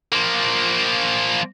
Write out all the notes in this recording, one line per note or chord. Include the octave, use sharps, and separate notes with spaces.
F3 A#3